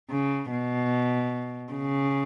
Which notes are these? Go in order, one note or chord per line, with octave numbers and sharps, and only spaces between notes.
C#3
B2
C#3